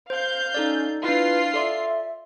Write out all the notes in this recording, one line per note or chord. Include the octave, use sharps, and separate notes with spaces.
C5 F5 G6
C#4 D#4 A4 D5
D4 E4 F4 B4 C7
A4 D5 E5 C6